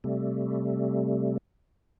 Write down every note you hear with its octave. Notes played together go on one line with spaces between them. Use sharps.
C3 G3 A3